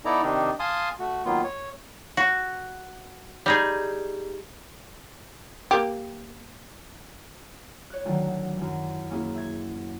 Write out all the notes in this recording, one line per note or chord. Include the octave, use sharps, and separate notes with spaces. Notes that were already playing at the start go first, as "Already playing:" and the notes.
B3 D#4 E4 A4 D5 A#5
C3 D#3 D4 D#4
F5 G#5 A5 C6 D#6
A3 F#4
D#3 F#3 A#3 B3 F4
C#5
F#4
G3 D#4 G#4
A#3 G4
C#5 F#6
D2 D#3 F#3
F#2 E3
A#3 C#4 E4 G#4
E5 G#6